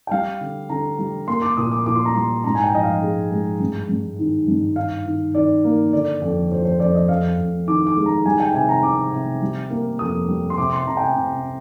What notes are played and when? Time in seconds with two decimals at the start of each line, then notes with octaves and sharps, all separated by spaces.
0.07 G5
0.11 G3 F5
0.41 D3
0.69 D3 A#5
0.99 G3
1.27 A#3 C6
1.42 D6
1.57 A#2 D#6
1.71 D6
1.86 A#2 D6
1.95 C6
2.05 A#5
2.15 G3 C6
2.44 G#2 A#5
2.55 G#5
2.64 G5
2.74 F3 D#5
2.83 F5
3.02 G#3
3.31 G#3
3.60 G2
3.89 G2
4.19 D#3
4.48 G2
4.76 D#3 F5
5.06 D#3
5.35 D#3 D5
5.64 A#3
5.93 D3 D5
6.22 F2
6.51 F3 C5
6.65 C5
6.80 F2 D5
6.95 D#5
7.09 F2 F5
7.38 F2
7.67 D#3 D6
7.87 D6
7.97 G#3
8.06 A#5
8.25 G3 G#5
8.40 G5
8.54 C3 G#5
8.69 A#5
8.83 C3 D6
9.12 C3
9.42 G3
9.70 A#3
9.99 F2 D#6
10.28 G3
10.50 C6
10.58 C3 D6
10.73 C6
10.87 C3 A#5
10.97 G5
11.01 G#5
11.16 C3